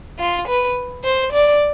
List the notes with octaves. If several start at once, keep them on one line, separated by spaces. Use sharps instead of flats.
F4
B4
C5
D5